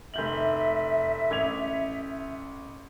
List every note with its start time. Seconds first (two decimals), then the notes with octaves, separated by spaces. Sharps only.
0.14 F1 E5 G6 F#7
1.31 A1 G#6 F7